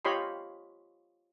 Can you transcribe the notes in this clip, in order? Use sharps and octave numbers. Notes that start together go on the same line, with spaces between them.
F4 G4 C#5 D#5 B5 C6